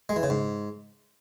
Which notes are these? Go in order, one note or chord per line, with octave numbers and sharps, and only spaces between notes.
G#3
E3
C#3
G#2